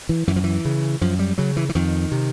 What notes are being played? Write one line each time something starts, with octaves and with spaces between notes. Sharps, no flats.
E3
F#2 E3
F3
E3
C#3
F#2 F3
G3
C#3 F#3
E3
E3
F2 D#3
C3